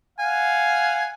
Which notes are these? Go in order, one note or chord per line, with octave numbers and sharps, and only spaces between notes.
F5 F#5 G#5